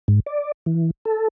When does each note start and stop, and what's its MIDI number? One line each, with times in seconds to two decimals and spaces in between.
0.08 0.20 44
0.26 0.52 74
0.66 0.91 52
1.05 1.28 69